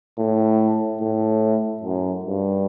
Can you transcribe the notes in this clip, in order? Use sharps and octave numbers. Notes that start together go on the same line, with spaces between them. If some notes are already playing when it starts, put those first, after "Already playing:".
A2
A2
F#2
G2